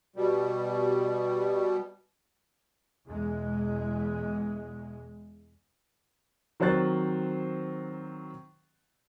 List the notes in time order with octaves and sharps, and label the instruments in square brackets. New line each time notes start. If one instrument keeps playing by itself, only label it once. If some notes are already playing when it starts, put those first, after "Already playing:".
[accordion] B2 G3
[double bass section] E2 B2 G#3
[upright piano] D#3 F#3 C4 C5 F#6 A6